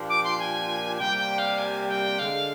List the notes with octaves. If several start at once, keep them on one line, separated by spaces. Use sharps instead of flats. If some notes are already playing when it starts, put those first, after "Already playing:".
Already playing: A#2 F3 A#3 D4 G4
D6
C6
G#5
C3 G3 A#3 G5
G5
F5
G#5
G5
D3 G#3 D4 F5